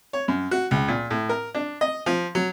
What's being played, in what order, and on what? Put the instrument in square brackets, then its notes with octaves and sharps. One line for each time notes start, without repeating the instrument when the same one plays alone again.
[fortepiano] C#5
F#2
F#4
C#2
A#2
A2
A#4
D4
D#5
F3
F#3